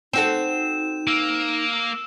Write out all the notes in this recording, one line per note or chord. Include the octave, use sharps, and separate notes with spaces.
C4 D#4 F#4 A4 E7
A#3 E6